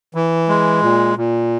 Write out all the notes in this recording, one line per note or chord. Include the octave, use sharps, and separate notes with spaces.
E3
G#3
A#2
A#2